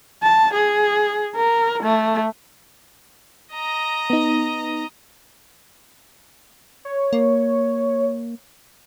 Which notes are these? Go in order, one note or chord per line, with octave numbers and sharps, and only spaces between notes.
A5
G#4
A#4
A3
D#5 A#5
B3 D#4
C#5
A#3